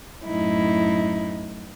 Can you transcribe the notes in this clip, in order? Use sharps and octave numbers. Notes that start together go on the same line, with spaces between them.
F#2 A2 D#4 E4